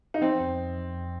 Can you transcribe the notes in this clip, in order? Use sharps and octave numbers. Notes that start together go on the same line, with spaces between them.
D#4
F3 C4
F2
F2
F3
F2